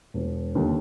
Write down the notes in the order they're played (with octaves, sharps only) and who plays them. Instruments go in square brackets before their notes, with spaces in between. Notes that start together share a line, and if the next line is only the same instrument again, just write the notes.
[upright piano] E1
D#2 D3